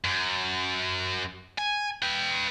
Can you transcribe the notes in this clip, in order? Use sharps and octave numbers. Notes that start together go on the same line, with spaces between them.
F#2
G#5
B4 G5